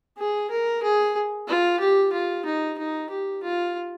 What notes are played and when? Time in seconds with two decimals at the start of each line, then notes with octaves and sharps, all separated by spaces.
0.18 G#4
0.51 A#4
0.83 G#4
1.48 F4
1.80 G4
2.13 F4
2.45 D#4
2.78 D#4
3.10 G4
3.43 F4